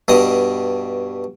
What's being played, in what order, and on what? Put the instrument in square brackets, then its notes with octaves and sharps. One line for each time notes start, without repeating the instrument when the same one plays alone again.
[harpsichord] G2 B2 D#5